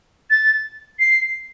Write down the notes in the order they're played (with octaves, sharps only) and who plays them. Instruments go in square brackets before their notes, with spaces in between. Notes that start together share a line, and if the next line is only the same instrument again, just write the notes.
[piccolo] A6
C7